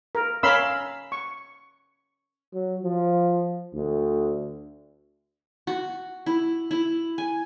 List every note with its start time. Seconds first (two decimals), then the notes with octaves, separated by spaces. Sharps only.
0.15 A#4
0.43 C#4 A#4 F5 B5 C6 E6
1.12 C#6
2.53 F#3
2.83 F3
3.75 D2
5.67 F#4
6.26 E4
6.71 E4
7.18 G#5